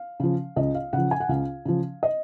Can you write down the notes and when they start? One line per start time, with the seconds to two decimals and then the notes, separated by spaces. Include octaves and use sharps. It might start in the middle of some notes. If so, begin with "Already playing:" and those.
Already playing: F5
0.20 C#3 F3
0.56 C#2 D#5
0.75 F5
0.93 C#3 F3 F#5
1.11 G#5
1.20 F#5
1.29 C#2 F5
1.65 C#3 F3
2.03 D#5